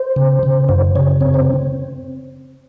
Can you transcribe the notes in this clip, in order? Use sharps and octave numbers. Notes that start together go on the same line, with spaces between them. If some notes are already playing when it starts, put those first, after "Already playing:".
Already playing: C5
C#3
C#3
F#2 C5
C#3 C#5
C4 C#5
C5